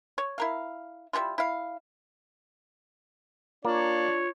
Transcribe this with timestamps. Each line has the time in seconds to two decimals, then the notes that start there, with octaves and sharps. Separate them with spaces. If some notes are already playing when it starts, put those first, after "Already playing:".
0.18 C#5
0.38 E4 A#4 F5
1.13 G3 C#4 E4 F4
1.38 E4 F5
3.65 A#3 D4 F4 C#5